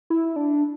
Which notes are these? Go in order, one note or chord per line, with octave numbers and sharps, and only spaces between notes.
E4
D4